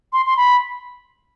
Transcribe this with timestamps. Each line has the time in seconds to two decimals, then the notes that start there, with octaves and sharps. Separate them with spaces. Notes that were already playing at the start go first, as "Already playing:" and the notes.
0.13 C6
0.26 C6
0.37 B5